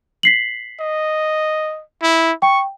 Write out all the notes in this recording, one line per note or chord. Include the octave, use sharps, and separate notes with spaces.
B6 C7 F#7
D#5
E4
G5 C#6